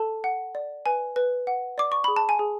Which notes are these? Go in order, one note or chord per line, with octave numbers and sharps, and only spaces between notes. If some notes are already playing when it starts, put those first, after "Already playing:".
Already playing: A4 A5
F#5
D5
B4 G#5
B4
F#5
D5 D6
C#6
G#4 B5
A5
G#5
G#4